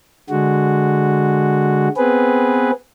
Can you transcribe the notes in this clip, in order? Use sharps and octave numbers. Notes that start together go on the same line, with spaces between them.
D3 G#3 F#4
B3 C4 G#4 B4